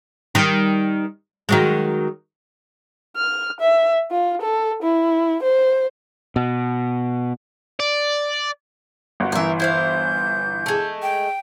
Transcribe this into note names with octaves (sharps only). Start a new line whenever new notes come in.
D#3 G3
D#3 F#3 G#3
F6
E5
F4
A4
E4
C5
B2
D5
G1 F#4
G1 E3 A#4 E5
E4 C5 F5 G6
G#3 A3
G5